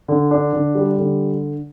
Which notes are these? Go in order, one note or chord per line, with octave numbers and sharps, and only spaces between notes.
D3
D4
D3
G3
D3